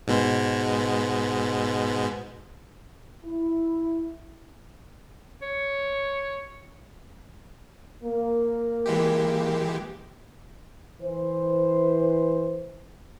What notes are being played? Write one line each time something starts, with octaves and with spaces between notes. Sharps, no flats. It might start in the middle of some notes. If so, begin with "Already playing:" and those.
G#2 B2 G#3
E4
C#5
A#3
E3 G#3 G4
E3 C5